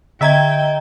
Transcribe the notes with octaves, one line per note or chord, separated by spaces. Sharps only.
D3 D#5 E5 G5 A#5 G#6